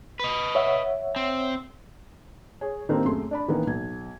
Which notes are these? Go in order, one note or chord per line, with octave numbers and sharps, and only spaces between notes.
B4 D#5
C#5 E5 F#5
C4
G#4 C#5
D#3 A#3 C4 D4 D#4 G4
F#2 A3 G#4 C6
D4 D5 B5
D#3 E3 A#3 B3 C#4
B1 G#6